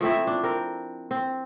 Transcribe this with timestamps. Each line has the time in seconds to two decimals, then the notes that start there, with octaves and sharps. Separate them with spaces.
0.01 F3 A3 C4 E4
0.27 D4
0.43 C4 A#4
1.11 C4